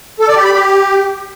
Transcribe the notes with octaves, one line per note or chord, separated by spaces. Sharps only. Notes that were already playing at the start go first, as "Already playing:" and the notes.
A4
D5
G4
B5
G4